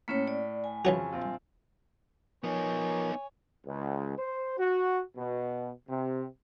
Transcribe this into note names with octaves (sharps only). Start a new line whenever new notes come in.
A2 A#3 C#4 C#5 F6 B6
D5
G#5
F2 C#3 E3 C#4 F#4
A#1 C4 F4
F3 B3 D#4 A#4 C#5 G#5
C#2
C5
F#4
B2
C3